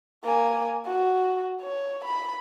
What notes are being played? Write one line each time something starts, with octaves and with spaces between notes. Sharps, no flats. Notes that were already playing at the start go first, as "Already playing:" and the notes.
A#3 G#5
F#4
C#5
B5